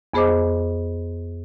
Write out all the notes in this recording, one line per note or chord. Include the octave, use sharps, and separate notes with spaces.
F2 B3 G#4 C5 D#5 D6